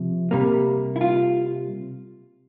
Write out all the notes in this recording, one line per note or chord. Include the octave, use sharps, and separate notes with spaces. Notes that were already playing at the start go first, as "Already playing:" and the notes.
Already playing: C3 F3
C3 G3 A#3
E4
F4